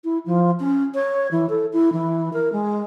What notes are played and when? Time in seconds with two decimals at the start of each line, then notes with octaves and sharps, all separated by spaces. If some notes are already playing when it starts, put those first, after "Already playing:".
0.04 E4
0.26 F3
0.60 C#4
0.95 C#5
1.32 E3
1.49 A4
1.73 E4
1.93 E3
2.33 A#4
2.53 G#3